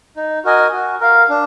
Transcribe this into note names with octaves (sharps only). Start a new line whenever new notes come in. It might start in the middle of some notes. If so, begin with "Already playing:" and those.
D#4
F#4 A#4 D#5 G#5
F#4
A#4 F5
D4